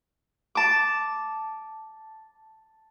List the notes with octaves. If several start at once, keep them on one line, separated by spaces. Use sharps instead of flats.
A5 D6